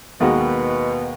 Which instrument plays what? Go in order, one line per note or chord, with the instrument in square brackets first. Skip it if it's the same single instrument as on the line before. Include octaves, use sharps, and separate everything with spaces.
[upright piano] D#2 D#3 G#3 B3 F#4 [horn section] B2